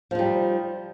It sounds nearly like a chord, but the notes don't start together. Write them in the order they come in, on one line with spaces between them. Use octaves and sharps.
F3 D#4 G3